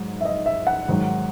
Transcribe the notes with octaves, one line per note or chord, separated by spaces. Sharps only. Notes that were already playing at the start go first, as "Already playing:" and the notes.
Already playing: G#2 F#3
E5
D#5
E5
F#5
G#2 D#3 F#3